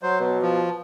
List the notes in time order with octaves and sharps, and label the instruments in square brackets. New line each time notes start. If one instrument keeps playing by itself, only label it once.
[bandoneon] F#3 C5
[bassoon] B2 [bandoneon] F#3
[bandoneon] F3